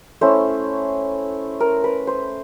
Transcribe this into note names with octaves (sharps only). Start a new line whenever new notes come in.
A3 C#4 E4 C5
A#4
B4
C5